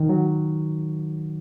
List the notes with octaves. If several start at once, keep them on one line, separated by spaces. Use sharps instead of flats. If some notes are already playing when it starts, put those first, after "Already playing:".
Already playing: D#3
F#3